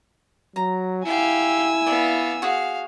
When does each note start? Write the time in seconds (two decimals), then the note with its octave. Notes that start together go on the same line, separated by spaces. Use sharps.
0.56 F#3 A#5
1.05 E4 G4 F5 G#5 E6
1.87 B3 D5 E5 F5
2.42 F#4 G#4 F5